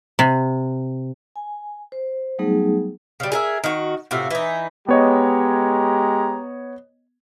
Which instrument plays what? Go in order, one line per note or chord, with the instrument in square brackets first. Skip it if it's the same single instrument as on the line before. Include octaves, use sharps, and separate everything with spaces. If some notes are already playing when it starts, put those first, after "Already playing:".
[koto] C3
[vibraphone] G#5
C5
F#3 G3 A3 B3 D#4 G#4
[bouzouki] C#3 G3
G#4 A#4 E5
D#3 F#4
A2 C3 F4 F#4
E3 D#4
[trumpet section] G#3 G4 A#5 [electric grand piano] B3 C#5 D#5